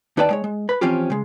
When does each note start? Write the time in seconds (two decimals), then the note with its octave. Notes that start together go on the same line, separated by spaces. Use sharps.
0.17 D#2 D#4 B4 D5 G5 A5
0.31 G#3 C#5
0.44 G#3
0.69 B4 B5
0.81 E3 F3 C4 C#4 F4 G4
1.10 C#3 G#3